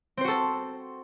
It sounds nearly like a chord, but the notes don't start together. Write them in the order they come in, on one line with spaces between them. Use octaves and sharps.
C4 C5 F#4 A4